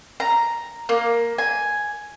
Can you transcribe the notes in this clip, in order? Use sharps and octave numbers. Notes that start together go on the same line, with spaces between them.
A#5
A#3
G#5